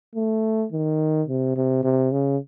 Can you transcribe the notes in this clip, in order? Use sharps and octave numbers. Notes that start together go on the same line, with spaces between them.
A3
D#3
C3
C3
C3
C#3